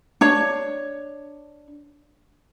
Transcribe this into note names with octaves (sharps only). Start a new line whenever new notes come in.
D4 C#5